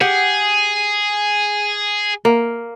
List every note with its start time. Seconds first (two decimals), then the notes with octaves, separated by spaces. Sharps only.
0.01 G4 G#4 F#5
2.25 A#3